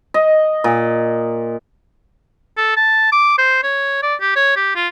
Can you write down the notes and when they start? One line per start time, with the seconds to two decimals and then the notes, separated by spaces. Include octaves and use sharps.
0.14 D#5
0.64 A#2
2.57 A4
2.77 A5
3.12 D6
3.38 C5
3.64 C#5
4.03 D5
4.21 G4
4.36 C#5
4.56 G4
4.76 F4